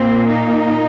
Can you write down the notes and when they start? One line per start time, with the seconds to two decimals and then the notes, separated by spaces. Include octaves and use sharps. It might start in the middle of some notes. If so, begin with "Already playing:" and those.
Already playing: A#2 A#3 C4
0.28 D#4